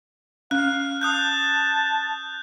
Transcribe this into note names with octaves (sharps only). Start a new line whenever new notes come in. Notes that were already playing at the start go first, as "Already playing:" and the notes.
C#4 F5 F#6
A5 D#6 F#6 G6